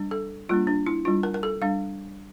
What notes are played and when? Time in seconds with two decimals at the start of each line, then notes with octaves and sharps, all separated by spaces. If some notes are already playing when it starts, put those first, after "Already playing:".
Already playing: G3 D4
0.11 A4
0.49 G3 A#3 D4 F4
0.67 D4
0.87 E4
1.05 G3 D4 F4
1.23 A#4
1.34 A#4
1.43 A4
1.62 G3 D4 F5